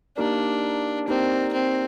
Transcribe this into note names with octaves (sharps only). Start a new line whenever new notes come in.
A#3 D4 D#4 G4 A#4 D5
A#3 C4 D#4 G4 A#4 D5
C4